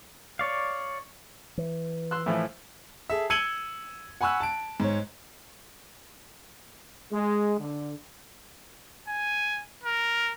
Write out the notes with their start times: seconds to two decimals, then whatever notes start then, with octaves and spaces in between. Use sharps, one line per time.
0.39 C#5 D5 F5
1.58 E3
2.11 C6 E6 F#6
2.26 A2 E3 F3
3.10 G#4 A4 E5
3.30 E6 G#6 C#7 D#7 F#7 G7
4.21 F#5 G#5 B5 C#6 E6 F#6
4.40 A5 D7
4.80 G#2 C#5
7.12 G#3
7.59 D3
9.08 G#5
9.84 A#4